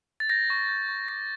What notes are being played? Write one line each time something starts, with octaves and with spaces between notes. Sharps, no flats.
A6
G6 A#6
C#6
G6
C#6
D6 A#6